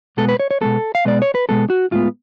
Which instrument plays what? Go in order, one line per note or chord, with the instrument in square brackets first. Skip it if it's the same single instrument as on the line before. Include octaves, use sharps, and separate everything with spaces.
[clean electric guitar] B2 G#3 B3 A4
B4
C#5
C#5
B2 G#3 B3 A4
F5
B2 G#3 B3 D5
C#5
B4
B2 G#3 B3 A4
F#4
A2 G#3 B3 F4